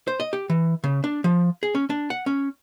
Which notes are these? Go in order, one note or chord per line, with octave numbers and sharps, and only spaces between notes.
C5
D#5
G4
E3
C#3
D4
F3
G#4
C#4
D4
F#5
C#4